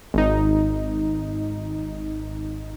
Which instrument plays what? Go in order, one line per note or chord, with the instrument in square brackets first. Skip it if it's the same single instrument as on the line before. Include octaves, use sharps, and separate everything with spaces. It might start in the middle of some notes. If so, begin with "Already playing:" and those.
[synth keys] G#1 D#4